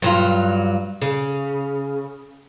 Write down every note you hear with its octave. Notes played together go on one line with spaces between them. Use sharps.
G2 F#3 F4
C#3